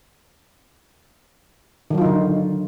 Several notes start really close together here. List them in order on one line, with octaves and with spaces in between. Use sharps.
D#3 F#3 F4 D#4 D3